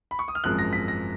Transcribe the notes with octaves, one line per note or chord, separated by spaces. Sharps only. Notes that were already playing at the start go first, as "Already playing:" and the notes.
B5
C#6
D#6
F6
G#1 F#2 F3 G#3 F#6
A#6
B6
A#6